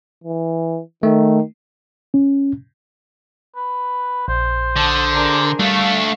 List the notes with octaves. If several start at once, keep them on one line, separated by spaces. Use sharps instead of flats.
E3
D#3 A3
C#4
B4
A#1 C5
D3 A5 D#6
D4 G#4 A#4
G3 A3 D4 E5 F5 C#6